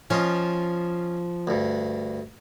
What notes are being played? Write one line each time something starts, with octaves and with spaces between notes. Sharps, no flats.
F3 C#4 F4 D#5
D2 G2